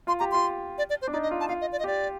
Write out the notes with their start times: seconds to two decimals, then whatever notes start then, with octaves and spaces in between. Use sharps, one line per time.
0.07 F4 C6
0.20 G4 A#5
0.32 F4 C6
0.78 D5
0.90 D5
1.02 C5
1.08 D4
1.13 D#4 D5
1.23 D#5
1.31 F4
1.40 A5
1.48 F4 F5
1.61 D#5
1.72 D5
1.79 D#5
1.84 G4 D5